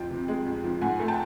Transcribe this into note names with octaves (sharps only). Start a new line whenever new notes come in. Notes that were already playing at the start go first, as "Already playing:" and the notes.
Already playing: F2 F3 G5
C3
G#3
F2
F3
G#2 F#5 G#5
A3
G5 A5